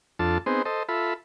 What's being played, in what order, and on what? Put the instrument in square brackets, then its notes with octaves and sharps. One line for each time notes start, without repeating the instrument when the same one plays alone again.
[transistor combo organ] F2 D4 F4 A4 A5
B3 C4 D#4 G#4 C5
A4 C5 D#5
F4 A4 E5 B5